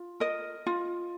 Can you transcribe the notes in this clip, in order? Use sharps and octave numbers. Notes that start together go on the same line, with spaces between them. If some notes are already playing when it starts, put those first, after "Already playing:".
Already playing: F4
A#4 D#5
F4